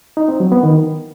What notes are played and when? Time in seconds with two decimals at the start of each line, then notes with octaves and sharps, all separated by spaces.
0.17 D#4
0.29 C4
0.40 F#3
0.52 B3
0.63 D#3